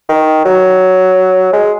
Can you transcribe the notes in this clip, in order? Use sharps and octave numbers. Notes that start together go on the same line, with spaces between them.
D#3
F#3
G#3